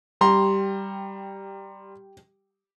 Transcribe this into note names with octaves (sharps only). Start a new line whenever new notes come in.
G3 G4 G5 A#5 C6